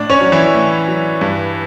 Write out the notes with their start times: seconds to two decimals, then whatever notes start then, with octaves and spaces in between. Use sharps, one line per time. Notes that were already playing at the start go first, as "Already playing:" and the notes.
Already playing: A2 D4 D5
0.10 C#4 C#5
0.21 F#3
0.32 E3 E4
0.54 A2
0.88 F#3
1.21 G2